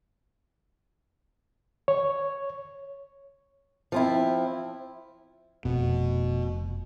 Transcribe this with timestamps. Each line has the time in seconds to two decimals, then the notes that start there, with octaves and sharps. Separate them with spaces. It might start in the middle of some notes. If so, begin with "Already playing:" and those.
1.88 C#5
3.92 F3 C4 E4
5.65 F1 B2